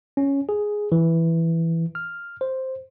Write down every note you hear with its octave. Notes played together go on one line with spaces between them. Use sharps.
C#4
G#4
E3
F6
C5